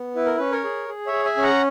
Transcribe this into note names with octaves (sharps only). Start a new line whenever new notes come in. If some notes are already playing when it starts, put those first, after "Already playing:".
Already playing: B3
E4 B4
A#4
C#4 B4
A#4 C#5
G#4
G#4
C#5 E5
G#4
E5 G#5
C#4
F#5 A#5